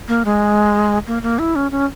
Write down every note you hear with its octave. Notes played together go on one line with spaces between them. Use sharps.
A#3
G#3
A#3
A#3
E4
C#4
C#4